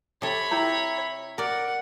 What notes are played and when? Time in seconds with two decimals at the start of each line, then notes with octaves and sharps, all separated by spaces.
0.22 C3 A4 C#5 B5
0.51 E4 G4 A#5
1.38 A#4 D5 F#5